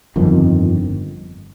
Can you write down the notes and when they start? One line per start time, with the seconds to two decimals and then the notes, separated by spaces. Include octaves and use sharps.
0.16 G1 F2 D#3